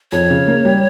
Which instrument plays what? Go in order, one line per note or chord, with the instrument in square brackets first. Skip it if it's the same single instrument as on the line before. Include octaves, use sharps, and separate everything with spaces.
[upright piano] F2 [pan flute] C#5
[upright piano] C#3
A#3
G3